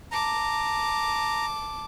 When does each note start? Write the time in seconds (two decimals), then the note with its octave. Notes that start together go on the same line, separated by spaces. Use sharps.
0.11 A5 A#5 D6